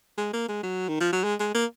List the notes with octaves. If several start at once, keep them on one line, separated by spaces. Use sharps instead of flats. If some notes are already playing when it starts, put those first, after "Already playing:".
G#3
A#3
G#3
F#3
D#3
F3
F#3
G#3
G#3
A#3